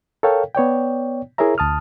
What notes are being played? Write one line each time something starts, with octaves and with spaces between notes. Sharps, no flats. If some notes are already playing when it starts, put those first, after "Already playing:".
A4 A#4 C#5 F5 G5
B3 C#5 D5 G5
E4 G#4 A#4 C#5 E5 A#5
D2 A5 D#6 F6